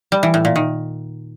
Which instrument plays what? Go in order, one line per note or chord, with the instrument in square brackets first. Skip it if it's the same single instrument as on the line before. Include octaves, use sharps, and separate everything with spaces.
[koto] G3
E3
A2
A#2
D#3